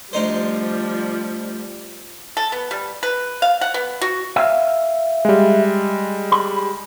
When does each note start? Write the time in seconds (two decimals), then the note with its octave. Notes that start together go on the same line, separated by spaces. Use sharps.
0.13 D2 F3 G3 D#4 C5
2.37 A4
2.52 B3
2.71 G3
3.03 B4
3.42 F5
3.61 F#5
3.74 B3
4.01 F#4
4.36 E5 F5
5.25 G3 G#3
6.32 B5